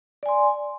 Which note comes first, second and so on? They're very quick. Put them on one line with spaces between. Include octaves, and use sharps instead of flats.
D5 G#5 C6